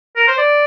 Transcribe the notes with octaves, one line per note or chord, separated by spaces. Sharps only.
A#4
C5
D5